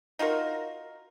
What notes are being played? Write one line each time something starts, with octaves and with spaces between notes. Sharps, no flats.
D#4 F4 F#4 A#4